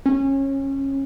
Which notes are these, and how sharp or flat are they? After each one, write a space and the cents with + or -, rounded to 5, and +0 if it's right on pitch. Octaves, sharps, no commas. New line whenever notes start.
C#4 -25